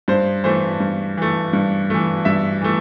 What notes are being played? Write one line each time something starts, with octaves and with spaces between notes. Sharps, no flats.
G2 C5
E3 A3 C5
G2
E3 A3
G2
E3 A3
G2 E5
E3 A3